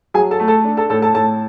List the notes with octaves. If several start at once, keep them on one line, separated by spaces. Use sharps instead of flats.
F#3 G#4 G#5
A4 A5
A3
A4 A5
D4
A4 A5
A2 A4 A5
A4 A5
A2 A4 A5